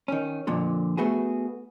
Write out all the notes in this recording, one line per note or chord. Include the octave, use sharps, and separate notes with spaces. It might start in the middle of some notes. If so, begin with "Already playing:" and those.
D#3 C#4
F2 A#2 D3
A3 B3 F#4 G#4